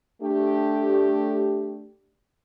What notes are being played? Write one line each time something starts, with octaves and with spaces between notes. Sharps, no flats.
A3 D4 G4